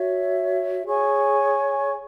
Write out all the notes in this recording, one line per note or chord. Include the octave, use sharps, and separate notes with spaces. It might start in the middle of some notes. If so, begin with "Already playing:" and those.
Already playing: F#4 C#5 E5
G#4 C#5 G#5 C#6